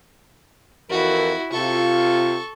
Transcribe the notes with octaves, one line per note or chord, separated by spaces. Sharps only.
F2 E3 E4 F#4 A#4
C3 F4 A4 C#6